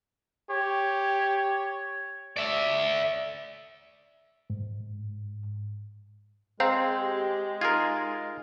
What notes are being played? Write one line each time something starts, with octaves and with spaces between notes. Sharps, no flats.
G4 C#5
D5 E5
G#2
G#3 C4 G#4 C5 F5 A#5
G4
D#4 F4 G#4 A#4 G#6